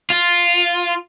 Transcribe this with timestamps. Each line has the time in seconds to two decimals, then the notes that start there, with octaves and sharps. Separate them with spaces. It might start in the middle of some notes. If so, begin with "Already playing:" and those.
0.10 F4